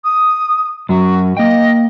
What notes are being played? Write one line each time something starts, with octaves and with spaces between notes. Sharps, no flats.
D#6
F#2 F#3 F#4
A#3 D#5 G5